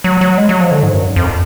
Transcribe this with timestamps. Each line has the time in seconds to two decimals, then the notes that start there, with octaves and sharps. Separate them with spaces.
0.04 F#3
0.21 F#3
0.38 G#3
0.49 F#3
0.60 F3
0.72 D3
0.83 G#2
0.94 F#2
1.16 F2